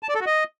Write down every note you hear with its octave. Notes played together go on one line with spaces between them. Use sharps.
A5
D5
A4
F#4
D#5